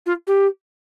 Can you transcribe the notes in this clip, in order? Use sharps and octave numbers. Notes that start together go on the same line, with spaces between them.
F4
G4